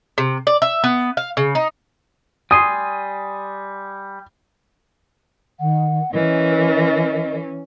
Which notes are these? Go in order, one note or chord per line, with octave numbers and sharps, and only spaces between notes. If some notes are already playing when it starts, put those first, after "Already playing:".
C3
D5
E5
B3
F5
C#3
D#4
G3 G#5 C6 D#6
D#3 F#5
E3 C#4 A#4 D#5